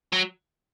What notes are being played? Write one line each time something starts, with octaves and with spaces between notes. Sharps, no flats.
F#3